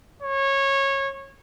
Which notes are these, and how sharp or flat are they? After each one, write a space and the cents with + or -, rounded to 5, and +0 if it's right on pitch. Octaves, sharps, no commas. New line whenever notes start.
C#5 -20